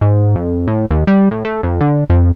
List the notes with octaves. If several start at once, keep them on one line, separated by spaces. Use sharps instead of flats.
G#2
F2
A2
D#2
G3
A2
A3
F2
D3
F2